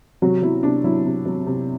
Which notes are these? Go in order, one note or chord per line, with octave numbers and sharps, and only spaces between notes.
C3 F#3 F#4
F#3 E4
C3 D4
F#3 E4
C3
F#3
C3